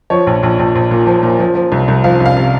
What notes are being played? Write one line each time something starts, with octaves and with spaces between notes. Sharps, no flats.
F3 C#5
A#1
A#1
A#1
A#1
A#2
F3
A#2
F3
F3
C2
C2
F3 F5
C2
F5
C3